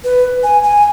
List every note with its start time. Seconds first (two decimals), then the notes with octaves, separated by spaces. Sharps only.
0.04 B4
0.43 G#5
0.63 G#5